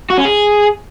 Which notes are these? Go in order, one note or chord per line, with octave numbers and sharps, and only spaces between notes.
F#4
C#4
G#4